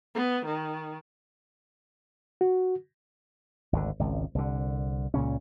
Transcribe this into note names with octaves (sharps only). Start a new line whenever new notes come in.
B3
D#3
F#4
G#1 D2 B2 D3
G#1 C#2
C2 D3
C#2 A#2 C#3 C#4